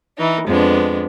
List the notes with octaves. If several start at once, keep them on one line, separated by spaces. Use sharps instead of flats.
E3 D#4
F2 G#3 B3 D4